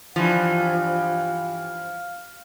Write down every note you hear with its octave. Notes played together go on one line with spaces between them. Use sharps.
G2 E3 F3 F5